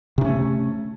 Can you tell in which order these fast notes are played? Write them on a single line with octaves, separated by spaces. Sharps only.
C3 D4 C#4 A3